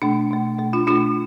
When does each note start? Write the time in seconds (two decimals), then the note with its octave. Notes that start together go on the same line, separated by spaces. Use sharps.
0.02 B2 A3 D4
0.30 B2 A3
0.59 B2 A3
0.73 D4 F4
0.87 B2 A3 D4 F4